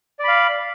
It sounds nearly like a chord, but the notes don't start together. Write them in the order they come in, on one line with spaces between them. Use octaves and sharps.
D5 B5 F5